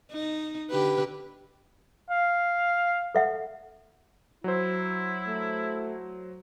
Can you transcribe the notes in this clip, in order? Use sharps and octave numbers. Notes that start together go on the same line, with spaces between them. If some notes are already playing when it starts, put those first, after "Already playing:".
D#4
D3 G4 B4
F5
A4 E5 F#5
F#3 E4 C5
A3